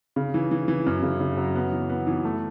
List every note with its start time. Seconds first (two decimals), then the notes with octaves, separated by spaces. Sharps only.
0.16 C#3
0.34 E3
0.51 E3
0.68 E3
0.86 F#2
1.03 C#3
1.20 C#3
1.37 F#3
1.55 B3
1.72 E3
1.90 B3
2.07 E3
2.25 A3